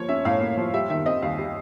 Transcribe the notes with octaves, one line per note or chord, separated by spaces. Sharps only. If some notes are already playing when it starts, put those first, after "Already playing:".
Already playing: F3 A#3 C#5
C#4 E5
A2 F5
A#3
F3
G3 E5
D#3 E5
C4 D#5
D#2 F5
G3